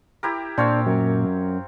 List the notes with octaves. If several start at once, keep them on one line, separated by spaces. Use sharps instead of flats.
E4 G4 A#4
A#2 C4 D4 C#5 F5
F#2